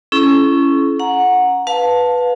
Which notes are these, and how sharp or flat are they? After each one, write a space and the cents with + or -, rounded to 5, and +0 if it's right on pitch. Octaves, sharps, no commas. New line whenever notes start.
C#4 +0 E4 +25 A4 -45
F#5 -15 A#5 +0
B4 +0 F5 +30 A5 +0